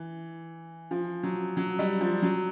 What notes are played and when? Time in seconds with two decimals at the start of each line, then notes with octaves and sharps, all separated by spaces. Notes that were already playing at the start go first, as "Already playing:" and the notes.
Already playing: E3
0.91 F3
1.23 F#3
1.57 F#3
1.79 G3
2.01 F3
2.22 F#3